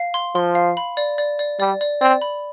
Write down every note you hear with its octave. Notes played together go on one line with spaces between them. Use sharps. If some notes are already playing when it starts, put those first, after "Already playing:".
Already playing: F5
C6
F3 C6
F5
B5
D5
D5
D5
G3 D5
D5
C4 D5
B5